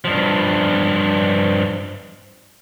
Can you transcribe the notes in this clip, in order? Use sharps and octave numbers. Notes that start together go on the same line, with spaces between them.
G2 F3